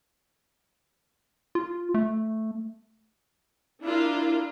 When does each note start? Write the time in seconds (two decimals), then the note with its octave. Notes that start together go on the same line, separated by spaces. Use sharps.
1.55 F4
1.94 A3
3.82 D4 E4 F4 A#4